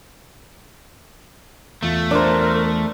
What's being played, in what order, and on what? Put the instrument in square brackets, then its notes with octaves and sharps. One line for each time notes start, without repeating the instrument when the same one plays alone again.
[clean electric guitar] E2 F4 [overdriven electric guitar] A3
[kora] D4 C5 [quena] A#4